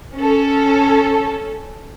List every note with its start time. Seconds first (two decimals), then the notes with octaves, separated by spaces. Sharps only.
0.15 C#4 A4